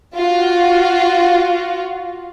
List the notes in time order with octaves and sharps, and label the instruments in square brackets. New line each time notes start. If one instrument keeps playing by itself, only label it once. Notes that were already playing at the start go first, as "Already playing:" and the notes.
[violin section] F4 F#4